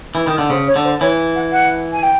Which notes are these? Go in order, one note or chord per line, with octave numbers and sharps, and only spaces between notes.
E3
D#3
D3
C#3 C5
C#5
D3
C5
E3 C#5
F#5
F#5
G#5
G5